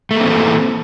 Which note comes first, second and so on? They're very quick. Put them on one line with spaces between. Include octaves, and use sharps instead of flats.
A3 A#3 C4 E3 A4